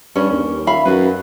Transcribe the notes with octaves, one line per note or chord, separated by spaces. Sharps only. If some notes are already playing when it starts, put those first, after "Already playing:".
G2 C#4
D#2
E5 F5 B5
F#2 B4